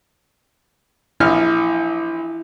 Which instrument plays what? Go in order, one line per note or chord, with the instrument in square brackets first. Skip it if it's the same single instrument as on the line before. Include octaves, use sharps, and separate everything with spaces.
[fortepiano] A#1 F6 [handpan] E4